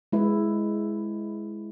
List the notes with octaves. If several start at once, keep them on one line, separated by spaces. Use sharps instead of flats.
G#3 E4 B4